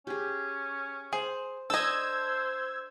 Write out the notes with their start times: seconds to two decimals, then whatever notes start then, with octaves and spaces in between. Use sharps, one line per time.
0.07 C#4 G4 G#4
1.13 G#4 C5
1.70 D4 A4 C5 D#5 E6 G#6